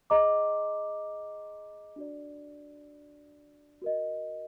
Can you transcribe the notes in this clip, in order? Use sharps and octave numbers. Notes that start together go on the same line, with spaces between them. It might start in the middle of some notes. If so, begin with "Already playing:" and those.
G#4 D#5 A#5 D6
D4 F#4 D5
F#4 A#4 D#5